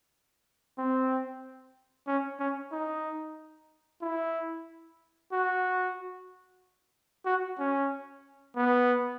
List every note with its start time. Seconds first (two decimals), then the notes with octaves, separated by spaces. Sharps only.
0.78 C4
2.07 C#4
2.40 C#4
2.72 D#4
4.02 E4
5.32 F#4
7.26 F#4
7.59 C#4
8.56 B3